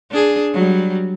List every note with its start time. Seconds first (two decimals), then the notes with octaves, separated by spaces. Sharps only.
0.11 D4 G#4
0.54 F#3 G3